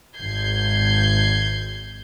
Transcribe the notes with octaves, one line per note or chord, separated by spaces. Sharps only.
G#1 G6 G#6 C7